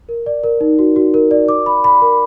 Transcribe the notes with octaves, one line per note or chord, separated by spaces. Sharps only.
A#4
D5
A#4
D#4
F#4
F#4
A#4
D5
D6
B5
B5
A#4